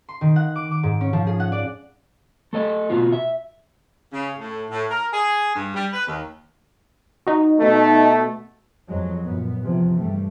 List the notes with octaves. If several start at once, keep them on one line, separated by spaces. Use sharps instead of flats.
C6
D#3
F#5
D6
D6
G#2
C#4
F3
G#4
F#5
D5
A3 A4 D#5
B2 B3 F4 F#4
E5
C#3
A2
A2
A#4
G#4
G2
G3
B4
D#2
D#4 F#4
B2 A3
F2 F#3 G#3
F#2 A#2 B3
E2 C3 E3 F3
G2 G3 A3